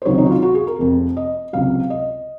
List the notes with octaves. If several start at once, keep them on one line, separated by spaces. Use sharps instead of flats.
C5
C#2 C3 D#3 F#3 C#5
D#4
F#4
F4
F#4
G#4
A#4
F1 F2 C3
D#5
C#2 C3 F#3 F5
D#5